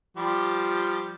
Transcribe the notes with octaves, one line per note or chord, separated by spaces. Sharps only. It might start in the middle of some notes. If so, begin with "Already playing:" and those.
F3 G3 G4